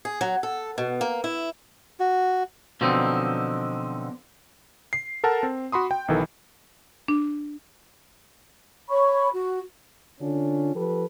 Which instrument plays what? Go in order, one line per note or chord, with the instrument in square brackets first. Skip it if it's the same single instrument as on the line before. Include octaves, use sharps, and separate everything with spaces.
[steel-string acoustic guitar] G#4
F#3
A4
B2
A#3
E4
[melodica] F#4
[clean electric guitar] B2 D3 F3 F#3 C4 D#4
[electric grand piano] C7
A4 A#4 F#5 A5
C4
F#4 B5 C6 D#6
G5
B1 D#3 E3 A4
[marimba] D4
[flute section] C#5 B5 C#6
F#4
[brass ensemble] D3 C#4 D4 F4
F3 G4 A4 B4